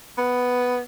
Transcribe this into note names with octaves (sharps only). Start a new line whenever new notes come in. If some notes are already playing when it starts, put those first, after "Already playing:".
B3